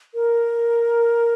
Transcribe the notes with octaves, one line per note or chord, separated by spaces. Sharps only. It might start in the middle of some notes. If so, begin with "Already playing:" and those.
A#4